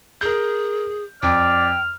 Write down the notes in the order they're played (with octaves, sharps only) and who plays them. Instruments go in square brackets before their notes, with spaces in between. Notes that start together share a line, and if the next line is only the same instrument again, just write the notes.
[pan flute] G#4 [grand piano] A#4 G6
[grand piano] F2 [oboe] D5 [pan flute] G5 [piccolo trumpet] F6